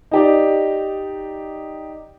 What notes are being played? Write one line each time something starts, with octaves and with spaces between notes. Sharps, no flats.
D#4 G4 D5